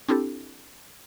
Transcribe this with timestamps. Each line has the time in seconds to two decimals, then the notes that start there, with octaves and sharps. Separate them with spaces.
0.09 C4 D4 E4 G4 A4